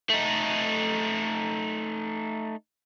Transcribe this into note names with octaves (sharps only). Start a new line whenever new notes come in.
A3 D#4